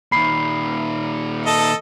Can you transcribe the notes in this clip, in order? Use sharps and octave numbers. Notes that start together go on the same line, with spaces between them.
A#2 D#3 B5 C7
A4 D#5 A5